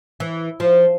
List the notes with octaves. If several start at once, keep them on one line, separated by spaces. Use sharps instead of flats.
E3
F3